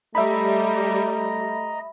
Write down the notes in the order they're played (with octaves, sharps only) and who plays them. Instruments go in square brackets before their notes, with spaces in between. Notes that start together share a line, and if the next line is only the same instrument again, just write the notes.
[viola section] G3 [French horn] A3 [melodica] D#5 A#5 [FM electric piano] E5 B5